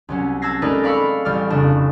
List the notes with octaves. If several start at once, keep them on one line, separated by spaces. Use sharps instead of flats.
C2 F#3 C#4
A5 E6 F#6 G#6 A#6 C7
G#3 A3 D#4 A#4 B4 D5
D5 F5 B5 C#6 E6
A1 G3 D5 F6
F1 C#3 D4 E7